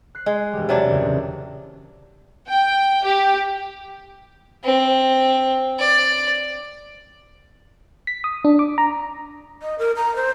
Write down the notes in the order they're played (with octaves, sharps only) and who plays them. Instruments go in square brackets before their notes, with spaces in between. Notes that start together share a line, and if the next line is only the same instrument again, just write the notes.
[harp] F#6 C7
[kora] G#3
[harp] E1 G3
[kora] C3 F#3 D4
[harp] E2 A#2 C#3
[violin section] G5
G4
[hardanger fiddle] C4
D5
[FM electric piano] B6
D#6
D4
D6
A#5
[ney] D#5
A#4
A#5
C5